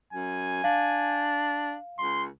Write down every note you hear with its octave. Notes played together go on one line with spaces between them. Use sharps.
F#2 G#5
D4 F5
C#2 C6